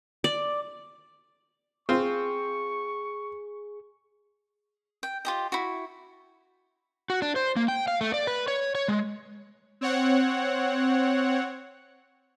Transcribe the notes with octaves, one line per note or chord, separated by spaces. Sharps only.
D5
C4 F4 G#4 C#6
G5
F4 G4 D#5
E4 F#4
F#4
D4
C5
A#3
G5
F5
A3
D5
B4
C#5
C#5
G#3
C4 C#5 F#5